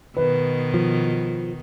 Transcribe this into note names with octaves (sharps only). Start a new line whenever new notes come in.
B2 D#3 B4
F3